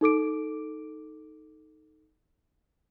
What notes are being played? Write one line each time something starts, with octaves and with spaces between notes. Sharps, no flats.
D#4 A4 D6 D7